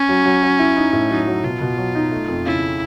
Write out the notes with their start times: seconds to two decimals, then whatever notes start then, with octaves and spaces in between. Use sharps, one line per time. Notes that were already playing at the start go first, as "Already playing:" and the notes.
Already playing: C#4
0.09 F#3
0.26 F#3
0.43 F#3
0.59 E4
0.77 D#4
0.93 A2
1.10 F#3 D#4
1.27 F#3
1.44 B2 F4
1.61 B2
1.78 F#3
1.95 D#4
2.11 A3
2.28 F2
2.46 C#3 E4